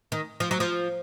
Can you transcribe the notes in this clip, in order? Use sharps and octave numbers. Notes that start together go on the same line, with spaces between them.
D#3
F3
F#3
F3